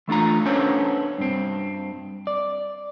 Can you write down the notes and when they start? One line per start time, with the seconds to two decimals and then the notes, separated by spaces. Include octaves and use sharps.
0.08 E3 A3 D4 F4 A#5
0.45 B3 C#4 D4 A4 C5 C#5
1.18 G2 C4
2.27 D5